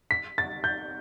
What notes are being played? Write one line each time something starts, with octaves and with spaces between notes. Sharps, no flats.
B6
A6
G6